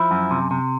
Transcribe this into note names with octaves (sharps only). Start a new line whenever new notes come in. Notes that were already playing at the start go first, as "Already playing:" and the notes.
Already playing: F3 E4
F#2
C3
C3